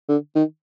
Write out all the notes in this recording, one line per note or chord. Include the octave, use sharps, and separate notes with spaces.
D3
D#3